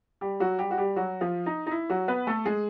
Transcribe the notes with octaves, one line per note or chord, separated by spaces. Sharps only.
G3 G4
F#3 F#4
G3 G4
F#4
G3 G4
F#3 F#4
F3 F4
D#4
D#4
E4
F#3 F#4
B3 B4
A3 A4
G#3 G#4